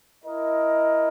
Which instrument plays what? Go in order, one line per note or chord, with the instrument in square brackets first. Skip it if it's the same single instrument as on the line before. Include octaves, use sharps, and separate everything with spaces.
[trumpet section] E4 A#4 D#5